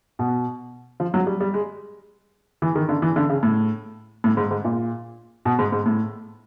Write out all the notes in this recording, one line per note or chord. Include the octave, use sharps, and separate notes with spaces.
B2
F3
F#3
G3
G3
G#3
E3
D#3
D3
E3
D3
C#3
A2
A2
G#2
G#2
A#2
B2
G#2
G#2
A2